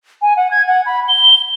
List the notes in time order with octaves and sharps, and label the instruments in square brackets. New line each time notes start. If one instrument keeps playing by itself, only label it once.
[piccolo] G#5
F#5
G#6
F#5
B5
G7